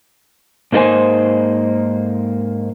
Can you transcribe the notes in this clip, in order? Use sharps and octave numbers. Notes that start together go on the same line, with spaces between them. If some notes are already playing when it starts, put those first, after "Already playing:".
G#2 A#3 D#4 A4 C5 G#5